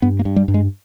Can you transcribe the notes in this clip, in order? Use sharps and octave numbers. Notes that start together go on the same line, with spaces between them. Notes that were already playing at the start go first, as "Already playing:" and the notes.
G2 B3
A#3
G2
G3
G2
G#3